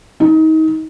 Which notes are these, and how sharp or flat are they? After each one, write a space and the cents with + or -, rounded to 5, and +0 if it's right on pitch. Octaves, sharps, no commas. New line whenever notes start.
D#4 +30